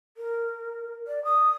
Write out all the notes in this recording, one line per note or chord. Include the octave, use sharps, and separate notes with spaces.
A#4
D5
D#6